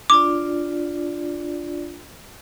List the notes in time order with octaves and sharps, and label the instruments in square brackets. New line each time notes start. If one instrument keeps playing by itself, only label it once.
[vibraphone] D4 F4 D5 [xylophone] D6